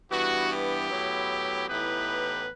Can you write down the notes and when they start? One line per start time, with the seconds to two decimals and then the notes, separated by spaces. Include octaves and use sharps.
0.10 G2 E3 B3 F#4
0.50 G4
0.89 A2 F#3 B3 E4
1.67 A2 E3 B3 D#4 G4 B4